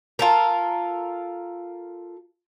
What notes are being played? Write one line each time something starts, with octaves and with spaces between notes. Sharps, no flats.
F4 A4 A#4